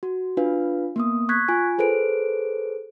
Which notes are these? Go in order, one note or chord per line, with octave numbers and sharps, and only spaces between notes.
F#4
D4 F4 B4 F5
A#3 B3 D#6
C#6 F#6 G#6 B6
F4 G#5
G#4 A4 B4 C5 D7